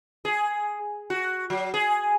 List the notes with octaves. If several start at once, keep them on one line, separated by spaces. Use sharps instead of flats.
G#4
F#4
F#3
G#4